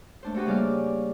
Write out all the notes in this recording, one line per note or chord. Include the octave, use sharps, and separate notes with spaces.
A3 D4 C5
A3 D4 F#4 G4 B4
C#3 G3 A#3 D5 D6 F6